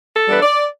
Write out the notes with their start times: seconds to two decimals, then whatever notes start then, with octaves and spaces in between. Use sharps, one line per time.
0.14 A4
0.28 E3 G3 B3 D4 B4
0.42 D5